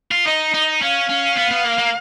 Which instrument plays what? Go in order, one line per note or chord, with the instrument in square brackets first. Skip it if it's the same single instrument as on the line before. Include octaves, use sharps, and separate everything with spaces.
[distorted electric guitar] F4
[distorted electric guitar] D#4 [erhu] D#5
[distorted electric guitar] D#4
[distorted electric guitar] C#4 [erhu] F5
[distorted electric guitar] C#4
B3
B3
A#3
A#3